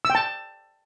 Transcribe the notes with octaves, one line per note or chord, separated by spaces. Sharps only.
E6
G5
A5